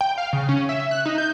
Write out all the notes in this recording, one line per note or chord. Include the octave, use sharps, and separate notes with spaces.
G5
F5
C#3
C#4
E5
F#6
D#4
G6